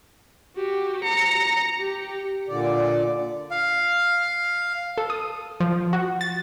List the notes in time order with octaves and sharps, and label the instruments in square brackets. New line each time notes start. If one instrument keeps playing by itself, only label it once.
[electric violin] F#4 G4
A#5 C#7
G4
[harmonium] A#2 D3 D5
[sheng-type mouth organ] F5
[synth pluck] A4
D#6
F3
F#4
A6